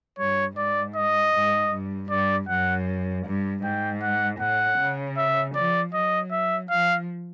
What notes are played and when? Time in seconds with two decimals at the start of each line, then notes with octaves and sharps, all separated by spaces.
0.19 G2 C#5
0.57 G#2 D5
0.96 D#5
1.34 G#2
1.72 G2
2.10 G2 D5
2.49 F#2 F#5
3.26 G2
3.63 G#2 G5
4.02 F#5
4.40 A2 F#5
4.78 C#3
5.17 E5
5.55 F3 D5
5.94 F#3 D#5
6.31 E5
6.70 F3 F5